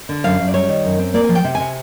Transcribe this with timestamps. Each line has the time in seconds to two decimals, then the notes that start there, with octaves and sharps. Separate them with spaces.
0.09 D3
0.24 F#2 F5
0.39 F#2
0.48 D5
0.54 G3 C#5
0.69 D#3
0.85 F#2
0.99 C4
1.14 A#3 D5
1.24 F3 G#5
1.35 G5
1.44 C3
1.55 G#5
1.60 C3